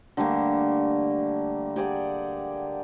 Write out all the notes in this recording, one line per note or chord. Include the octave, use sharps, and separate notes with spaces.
D3 G3 A3 A#3
G4 G#4 D5 F#5